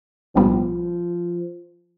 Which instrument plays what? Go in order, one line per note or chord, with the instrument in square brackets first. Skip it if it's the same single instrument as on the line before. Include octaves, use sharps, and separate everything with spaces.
[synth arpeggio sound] B1 A2 G3 B3 [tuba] F3